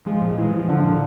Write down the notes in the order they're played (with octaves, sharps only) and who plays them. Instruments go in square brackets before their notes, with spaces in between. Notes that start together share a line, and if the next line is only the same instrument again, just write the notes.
[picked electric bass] F3 [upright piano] G#3
[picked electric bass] A#2
[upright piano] E3 [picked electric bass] G#3
[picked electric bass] F3
[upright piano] D3 [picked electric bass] F3
[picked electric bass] A#2